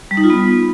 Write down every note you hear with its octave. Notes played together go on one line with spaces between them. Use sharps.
G3
D#4
F4
B3